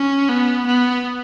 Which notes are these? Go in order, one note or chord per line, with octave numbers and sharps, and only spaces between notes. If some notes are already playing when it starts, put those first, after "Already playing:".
Already playing: C#4
B3
B3